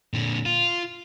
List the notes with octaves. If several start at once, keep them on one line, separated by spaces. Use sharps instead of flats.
A#2 D3
F4